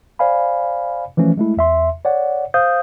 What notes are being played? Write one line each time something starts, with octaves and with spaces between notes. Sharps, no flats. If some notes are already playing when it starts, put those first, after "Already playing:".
C5 D5 F5 G#5 B5
E3 F3 A3 C#4
G#3 A3 E4
E2 E5 C6
C#5 D5 F#5
C5 F5 D#6 G6